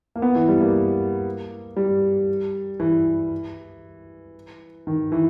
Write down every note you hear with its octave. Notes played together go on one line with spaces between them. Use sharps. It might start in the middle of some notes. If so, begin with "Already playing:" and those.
A#3
B3
E3
G3
A#3
G3
E3
D#3
E3